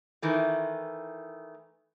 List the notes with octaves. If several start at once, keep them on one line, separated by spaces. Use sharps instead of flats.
D#3 E3 A3